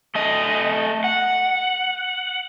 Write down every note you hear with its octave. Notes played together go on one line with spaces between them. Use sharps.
A3 D#5
F#5